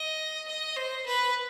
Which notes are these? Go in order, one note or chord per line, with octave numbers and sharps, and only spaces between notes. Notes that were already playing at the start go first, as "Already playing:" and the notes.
Already playing: D#5
D#5
C5
B4